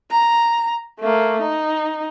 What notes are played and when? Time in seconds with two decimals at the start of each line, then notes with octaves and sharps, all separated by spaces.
0.11 A#5
1.00 A3 A#3
1.41 D#4